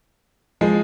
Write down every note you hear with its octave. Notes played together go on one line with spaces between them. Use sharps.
F3 G#3